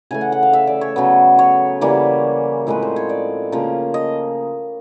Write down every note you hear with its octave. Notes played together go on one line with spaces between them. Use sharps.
C#3 E3 A3 G#5
F#5
F#5
F5
E5
D5
C#5
C#3 F#3 B3
C#5
C#3 E3 G3 A#3
A2 F3 G#3 C4 B4
C5
C#5
D5
C#3 F3 A#3
D#5